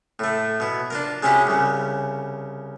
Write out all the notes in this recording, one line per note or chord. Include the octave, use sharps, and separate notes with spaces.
A2 A3
B2 E4
D4 F4 A#4
G#3 C4 C#4 E4 F#4 G4
C2 C#3